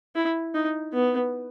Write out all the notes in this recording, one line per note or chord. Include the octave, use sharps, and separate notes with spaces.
E4
D#4
B3